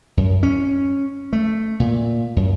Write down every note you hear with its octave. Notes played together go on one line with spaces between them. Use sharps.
F#2
C#4
A3
A#2
F#2